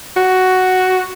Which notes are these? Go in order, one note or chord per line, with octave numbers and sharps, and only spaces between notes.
F#4